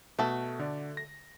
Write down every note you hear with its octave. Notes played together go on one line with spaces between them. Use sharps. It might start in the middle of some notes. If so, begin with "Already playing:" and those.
B2 A3 F#4 A4
D3 D5
A#6